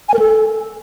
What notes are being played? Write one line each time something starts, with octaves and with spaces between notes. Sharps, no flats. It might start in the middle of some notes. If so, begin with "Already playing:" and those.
G#5
A#4
A4